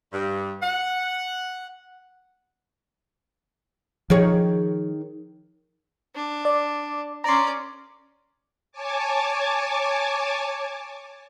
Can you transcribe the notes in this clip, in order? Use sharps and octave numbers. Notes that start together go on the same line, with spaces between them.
G2
F#5
D#3 F3 G#4 C#5
D4
D5
C#4 D5 A#5 C6
C#5 G#5 A5 D6